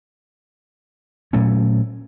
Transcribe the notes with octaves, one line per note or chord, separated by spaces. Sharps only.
A#2 F#3 A3 C#4